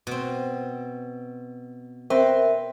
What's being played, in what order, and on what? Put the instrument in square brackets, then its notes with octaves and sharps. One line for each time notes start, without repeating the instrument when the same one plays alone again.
[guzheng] B2 C4
[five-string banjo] C4 [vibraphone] A#4 E5 [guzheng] B4